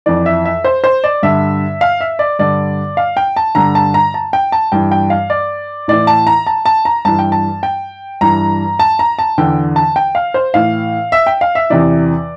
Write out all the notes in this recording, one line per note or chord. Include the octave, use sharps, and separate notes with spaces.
F2 E3 D5
E5
E5
C5
C5
D5
G2 D3 E5
F5
E5
D5
G2 D3 D5
F5
G5
A5
G2 D3 A#5
A5
A#5
A5
G5
A5
G2 E3 G5
G5
F5
D5
A2 E3 D5
A5
A#5
A5
A5
A#5
G2 E3 A5
G5
A5
G5
G2 E3 A#5
A5
A#5
A5
E2 D3 G5
A5
G5
F5
C5
A2 E3 F5
E5
G5
F5
E5
E2 C3 E3 D5